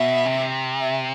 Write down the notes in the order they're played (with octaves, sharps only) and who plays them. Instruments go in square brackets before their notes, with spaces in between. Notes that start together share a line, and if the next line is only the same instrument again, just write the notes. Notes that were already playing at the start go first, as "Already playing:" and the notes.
Already playing: [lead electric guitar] B2 [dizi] E5
[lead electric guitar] C3
[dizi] E5